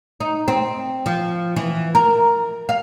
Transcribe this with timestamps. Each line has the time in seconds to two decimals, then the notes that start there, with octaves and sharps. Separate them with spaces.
0.20 D#4
0.48 C4
1.06 F3
1.56 E3
1.95 A#4
2.69 F5